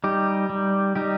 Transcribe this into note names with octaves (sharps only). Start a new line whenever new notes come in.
G3 D#4 G4
G3
G3 D#4 G4